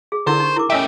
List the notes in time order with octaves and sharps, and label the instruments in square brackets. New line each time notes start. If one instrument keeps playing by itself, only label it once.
[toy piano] G#4
[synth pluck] D3 [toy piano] D#4 E4 A#4 [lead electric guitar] C5
[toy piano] D#4 C#6
E4 A#4 D6
[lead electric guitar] A3 G4 [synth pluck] C#4 D#5 E5